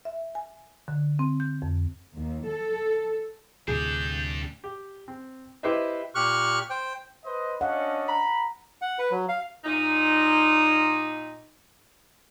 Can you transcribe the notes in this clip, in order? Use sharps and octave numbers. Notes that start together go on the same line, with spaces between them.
E5
G#5
D3
C4
G6
F2
D#2
A4
D2 A2 C3 D4 G4 G#4 G6
G4
C4
E4 G4 B4 C5 D#5 E5
A#2 G4 C#6 F6 F#6
C5 G5
B4 C5 D#5
C#4 D4 D5 D#5 F5 F#5
A#5 B5
F#5
B4
F#3
F5
A#2 D#4